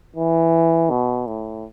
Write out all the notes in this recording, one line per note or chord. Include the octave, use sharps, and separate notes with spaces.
E3
B2
A2